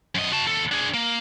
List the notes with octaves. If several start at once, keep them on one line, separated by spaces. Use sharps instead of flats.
F#2 D#5
F#4 A5
D#2 A4
D4 G#4
A#3